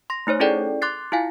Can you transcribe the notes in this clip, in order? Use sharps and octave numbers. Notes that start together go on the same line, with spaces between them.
C6 A#6
A3 D#4 C5 C#5
C#4 E4 G#4 A4 D5 G5
C6 D6 F#6 A6 C7
E4 F4 F5 G#5